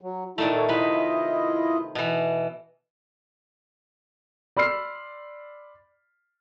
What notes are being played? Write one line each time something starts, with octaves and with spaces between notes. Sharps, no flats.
F#3
A#2 D#3 A3 E4
A4 C#5
C3 E4 F4 B4 D#5
B2 E3
D5 B5 C6 E6 F6 C7